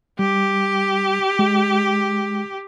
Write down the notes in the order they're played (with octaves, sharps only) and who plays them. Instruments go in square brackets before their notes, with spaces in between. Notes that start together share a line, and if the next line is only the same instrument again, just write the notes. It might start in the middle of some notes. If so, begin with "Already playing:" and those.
[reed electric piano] G3 [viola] G4
[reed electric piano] G#3